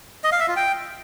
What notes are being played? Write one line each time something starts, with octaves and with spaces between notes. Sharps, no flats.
D#5
F5
E5
F4
G5